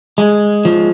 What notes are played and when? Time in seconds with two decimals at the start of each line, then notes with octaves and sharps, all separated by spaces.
0.18 G#3
0.65 F3